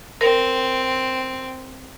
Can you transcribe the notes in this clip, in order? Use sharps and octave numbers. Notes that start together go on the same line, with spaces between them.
C4 A#4